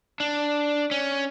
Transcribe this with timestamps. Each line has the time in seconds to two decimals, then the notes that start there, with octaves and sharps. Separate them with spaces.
0.20 D4
0.91 C#4